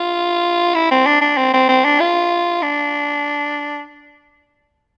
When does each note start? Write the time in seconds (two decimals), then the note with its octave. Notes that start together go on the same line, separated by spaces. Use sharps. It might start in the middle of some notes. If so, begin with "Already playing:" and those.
Already playing: F4
0.75 E4
0.91 C4
1.07 D4
1.22 D4
1.38 C4
1.54 C4
1.69 C4
1.85 D4
2.00 F4
2.62 D4